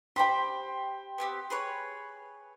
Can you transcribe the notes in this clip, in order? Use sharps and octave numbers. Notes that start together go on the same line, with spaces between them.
G4 C5 G5 B5 C6
B3 C4 G4
G#4 B4 C#5